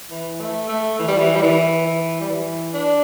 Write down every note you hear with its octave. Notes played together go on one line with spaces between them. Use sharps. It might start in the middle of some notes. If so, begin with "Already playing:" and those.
E3
A3
A3
E3
G3
E3
G3
E3
E3
G3
E3
D4